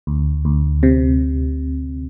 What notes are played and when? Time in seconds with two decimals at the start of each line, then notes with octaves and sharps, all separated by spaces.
0.07 D2
0.45 D2
0.83 C3